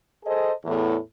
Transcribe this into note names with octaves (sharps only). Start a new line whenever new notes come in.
G#4 A4 C5 D#5
E2 A2